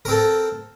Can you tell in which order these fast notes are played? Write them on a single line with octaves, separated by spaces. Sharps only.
A#4 C4 A4